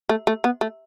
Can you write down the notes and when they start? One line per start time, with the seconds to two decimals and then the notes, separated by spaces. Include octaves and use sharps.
0.09 A3
0.27 A3
0.44 B3
0.61 A3